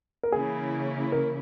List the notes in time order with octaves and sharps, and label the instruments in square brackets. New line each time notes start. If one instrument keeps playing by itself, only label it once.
[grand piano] A#4
[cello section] C#3 E3 A#3 C#4 E4 [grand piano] G#4
[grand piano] A#4